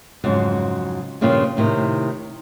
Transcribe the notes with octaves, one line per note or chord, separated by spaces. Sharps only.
F2 G#2 C#3 F#3
G2 A#2 C#3 F3 C4 F4
A2 C3 D#3